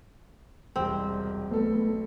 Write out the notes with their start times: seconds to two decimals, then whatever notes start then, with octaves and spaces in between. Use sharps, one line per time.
0.76 E1 C2 C4
1.51 B1 A3 B3 A4